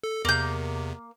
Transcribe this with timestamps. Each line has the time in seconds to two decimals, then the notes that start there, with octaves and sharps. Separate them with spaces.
0.03 A4
0.25 E2 C3 A#3 G6